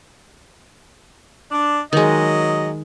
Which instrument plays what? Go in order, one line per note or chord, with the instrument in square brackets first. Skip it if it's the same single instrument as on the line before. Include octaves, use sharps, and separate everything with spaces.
[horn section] D4
[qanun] D#3 G#3 [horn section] F#3 G#4 D#5